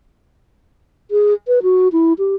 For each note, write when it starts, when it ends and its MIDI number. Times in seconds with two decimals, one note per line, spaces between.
1.11 1.33 68
1.48 1.59 71
1.63 1.88 66
1.92 2.13 64
2.18 2.35 67